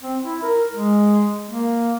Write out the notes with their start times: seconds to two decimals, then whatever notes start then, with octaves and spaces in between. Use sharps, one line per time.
0.02 C4
0.23 E4
0.42 A#4
0.73 G#3
1.49 A#3